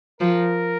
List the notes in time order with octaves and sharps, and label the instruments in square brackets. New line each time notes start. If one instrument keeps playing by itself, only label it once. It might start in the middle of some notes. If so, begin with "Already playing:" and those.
[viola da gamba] F3 [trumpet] A#4